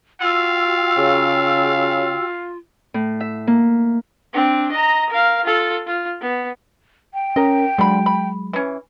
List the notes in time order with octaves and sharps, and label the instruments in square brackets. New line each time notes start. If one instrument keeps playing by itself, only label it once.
[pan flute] F4 [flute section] F#4 G5 E6 [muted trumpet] F5
[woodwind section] C#3
[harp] A2
E5
A#3
[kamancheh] C4 D4
D#5 A#5
A#4 F5
F4 A4
F4
B3
[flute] G5
[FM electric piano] C#4 A#4 A#5 [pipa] D#5
[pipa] D3 B5 [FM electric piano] F#3 G#3
[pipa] B5
E3 C#4